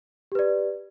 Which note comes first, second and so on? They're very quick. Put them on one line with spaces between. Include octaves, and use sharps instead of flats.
G4 B4 D5